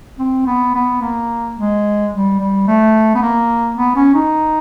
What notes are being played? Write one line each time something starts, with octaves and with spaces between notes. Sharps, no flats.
C4
B3
B3
A#3
G#3
G3
G3
A3
B3
A#3
B3
C#4
D#4